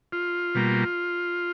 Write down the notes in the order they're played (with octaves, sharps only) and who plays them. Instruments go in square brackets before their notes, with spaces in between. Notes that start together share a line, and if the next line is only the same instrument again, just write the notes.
[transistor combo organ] F4
B2 G3 A#3